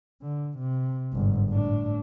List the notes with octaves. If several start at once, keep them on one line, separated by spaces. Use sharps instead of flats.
D3
C3
G1 G#2
A2 D4